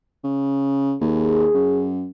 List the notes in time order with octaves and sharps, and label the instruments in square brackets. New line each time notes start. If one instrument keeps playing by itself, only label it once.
[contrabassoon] C#3
[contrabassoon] D#2 [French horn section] G#4
[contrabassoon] F#2